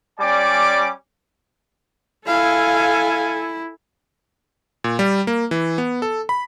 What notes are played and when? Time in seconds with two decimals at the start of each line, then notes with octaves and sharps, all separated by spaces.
0.20 G3 C#4 D5 G#5 D6
2.28 E4 A4 F5 G#5
4.84 A#2
4.99 G3
5.27 A#3
5.51 E3
5.78 B3
6.02 A4
6.29 B5